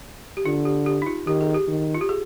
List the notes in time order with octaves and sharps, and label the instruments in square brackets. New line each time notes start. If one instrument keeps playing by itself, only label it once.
[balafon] G4
[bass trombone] D3 [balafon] F4
[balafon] G4
G4
D#4
F4
[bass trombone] D#3 [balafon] G4
[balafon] G#4
G4
[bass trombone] D#3
[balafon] F4
G4
G#4